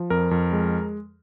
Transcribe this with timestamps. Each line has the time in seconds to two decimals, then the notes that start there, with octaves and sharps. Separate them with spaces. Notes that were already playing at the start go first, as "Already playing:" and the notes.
Already playing: F3
0.10 F2 A#4
0.31 F2
0.53 G#3